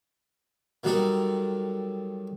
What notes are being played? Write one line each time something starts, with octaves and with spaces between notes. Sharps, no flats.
D#3 F#3 G3 D#4 A4 A#4